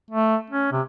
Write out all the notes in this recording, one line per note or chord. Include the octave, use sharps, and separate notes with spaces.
A3
C#4
C3